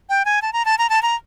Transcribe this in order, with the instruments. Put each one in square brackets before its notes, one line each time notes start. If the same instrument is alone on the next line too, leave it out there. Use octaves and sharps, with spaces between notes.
[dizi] G5
G#5
A5
A#5
A5
A#5
A5
A#5